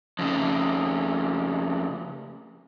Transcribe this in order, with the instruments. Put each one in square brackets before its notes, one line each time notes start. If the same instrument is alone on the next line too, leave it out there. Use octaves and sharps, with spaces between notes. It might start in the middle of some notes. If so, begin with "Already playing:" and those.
[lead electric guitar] F2 C#3